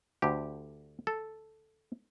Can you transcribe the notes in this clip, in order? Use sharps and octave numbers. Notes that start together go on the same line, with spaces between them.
D2 D3 G4
A4